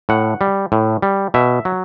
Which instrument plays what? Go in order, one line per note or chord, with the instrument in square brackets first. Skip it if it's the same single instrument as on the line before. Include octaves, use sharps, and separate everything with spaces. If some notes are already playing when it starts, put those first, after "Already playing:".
[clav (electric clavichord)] A2 F#5
G3
A2
G3
B2 E5
F#3